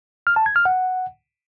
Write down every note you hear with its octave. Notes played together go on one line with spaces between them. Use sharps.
F6
A5
G#6
F6
F#5